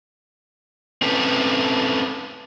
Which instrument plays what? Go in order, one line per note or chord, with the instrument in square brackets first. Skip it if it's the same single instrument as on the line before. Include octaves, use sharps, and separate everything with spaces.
[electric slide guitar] C4 C#4 A4 B4